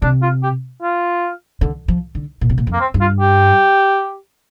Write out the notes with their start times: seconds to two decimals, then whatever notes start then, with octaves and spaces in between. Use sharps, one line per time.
0.02 C3 D4
0.22 F4
0.43 G4
0.82 F4
1.61 D3
1.88 F3
2.15 D3
2.41 A#2
2.49 C3
2.58 A#2
2.67 F2
2.73 A#3
2.80 C4
2.94 G2
3.01 F4
3.20 G4